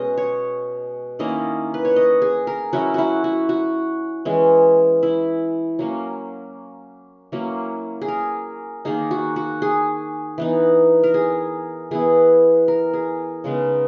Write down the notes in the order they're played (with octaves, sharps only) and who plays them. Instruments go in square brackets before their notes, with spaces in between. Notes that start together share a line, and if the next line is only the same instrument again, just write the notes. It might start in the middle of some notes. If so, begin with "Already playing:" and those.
Already playing: [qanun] B2 G#3 C#4 D#5
C#5
D#3 A#3 C#4 E4 D#5
B4
C#5
D#5
G#4
A#4
F#3 C#4 E4 F#4
E4 F#4
F#4
F#4
E3 G#3 C#4
E4
F#3 A#3 C#4
F#3 A#3 C#4 E4
G#4
A#4
D#3 A#3 D#4 G#4
F#4
F#4
G#4
E3 B3 D#4
A#4
G#4
E3 B3 E4 G#4
A#4
G#4
C#3 G#3 B3 D#4